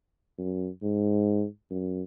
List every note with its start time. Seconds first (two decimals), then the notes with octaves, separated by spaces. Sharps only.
0.38 F#2
0.82 G#2
1.70 F#2